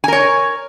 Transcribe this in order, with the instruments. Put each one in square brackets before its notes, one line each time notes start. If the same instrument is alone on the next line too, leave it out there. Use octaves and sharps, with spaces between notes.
[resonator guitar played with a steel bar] G#5
A#4
C#5